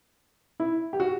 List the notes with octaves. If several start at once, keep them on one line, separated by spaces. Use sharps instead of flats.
E4
G4
F#4